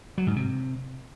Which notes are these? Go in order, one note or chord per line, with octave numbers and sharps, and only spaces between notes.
F#3
G#2
C3